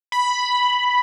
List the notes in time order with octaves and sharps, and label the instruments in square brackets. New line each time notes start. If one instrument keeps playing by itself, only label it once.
[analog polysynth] B5